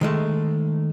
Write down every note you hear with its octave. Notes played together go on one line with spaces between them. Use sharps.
D#3 G#3 A3